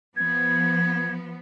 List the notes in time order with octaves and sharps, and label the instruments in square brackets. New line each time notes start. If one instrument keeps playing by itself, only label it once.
[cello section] F3 B3 [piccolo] G#6